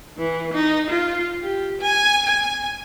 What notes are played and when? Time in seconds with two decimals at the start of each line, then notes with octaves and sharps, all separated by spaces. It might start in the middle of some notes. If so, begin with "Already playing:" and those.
0.18 E3
0.54 D#4
0.90 F4
1.42 G4
1.82 G#5
2.26 G#5